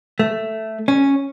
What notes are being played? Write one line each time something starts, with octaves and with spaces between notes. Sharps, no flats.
A3
C#4